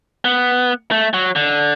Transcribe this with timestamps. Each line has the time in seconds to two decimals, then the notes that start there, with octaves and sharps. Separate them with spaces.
0.25 B3
0.91 A3
1.14 F#3
1.36 D3